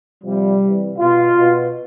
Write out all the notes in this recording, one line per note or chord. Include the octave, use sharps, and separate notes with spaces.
C3 F3 G3
C3 E3
B2 F4
B2